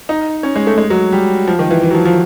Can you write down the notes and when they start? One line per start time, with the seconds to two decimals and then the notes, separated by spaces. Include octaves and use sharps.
0.09 D#4
0.43 C#4
0.56 G#3
0.67 A3
0.78 G#3
0.90 F#3
1.12 G3
1.47 F3
1.59 D#3
1.71 E3
1.83 E3
1.91 F#3
1.95 F3
2.05 F3